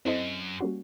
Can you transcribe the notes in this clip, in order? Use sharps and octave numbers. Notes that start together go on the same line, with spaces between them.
F#2 C4 E4 A4 C5 D#5
G3 A#3 C#4 F#4